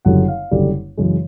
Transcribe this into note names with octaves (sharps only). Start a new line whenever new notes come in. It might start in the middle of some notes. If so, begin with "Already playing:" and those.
F#1 F#2 D3 G3 F#5
F5
F#1 F#2 D3 G3
F#2 C#3 E3 G#3